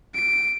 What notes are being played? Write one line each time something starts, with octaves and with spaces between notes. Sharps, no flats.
D7